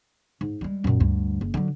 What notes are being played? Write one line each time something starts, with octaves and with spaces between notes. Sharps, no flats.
G#2
G3 G#3
F#2 A#2
D2 G2
F#1
D3 F#3